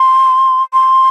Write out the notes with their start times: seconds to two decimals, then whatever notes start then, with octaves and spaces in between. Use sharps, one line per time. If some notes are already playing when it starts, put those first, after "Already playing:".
Already playing: C6
0.73 C6